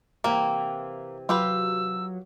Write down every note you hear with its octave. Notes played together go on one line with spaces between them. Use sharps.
C3 E3 A#3 C4
F#3 F4 G4 B4 E6